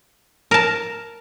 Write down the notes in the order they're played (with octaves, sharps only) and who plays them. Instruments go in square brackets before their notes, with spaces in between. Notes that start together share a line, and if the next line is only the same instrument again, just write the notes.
[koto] A#4 A5